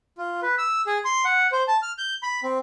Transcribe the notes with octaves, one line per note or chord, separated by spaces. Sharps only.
F4
B4
E6
G#4
C6
F#5
C5
A5
F6
G6
B5
C4